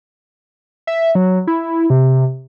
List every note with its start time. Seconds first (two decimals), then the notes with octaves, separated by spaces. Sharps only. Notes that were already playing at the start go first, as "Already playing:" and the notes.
0.87 E5
1.15 F#3
1.47 E4
1.90 C3